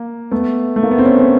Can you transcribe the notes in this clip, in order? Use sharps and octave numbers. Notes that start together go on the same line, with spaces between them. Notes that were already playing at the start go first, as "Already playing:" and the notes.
Already playing: A#3
A3 B3
A3
A#3
B3
C4
B3 C#4
C#4